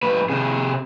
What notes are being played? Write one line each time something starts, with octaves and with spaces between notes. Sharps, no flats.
G#2 B4
C3 G#4